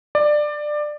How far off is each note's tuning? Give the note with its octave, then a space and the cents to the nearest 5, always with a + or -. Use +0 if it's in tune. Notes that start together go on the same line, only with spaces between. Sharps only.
D5 +20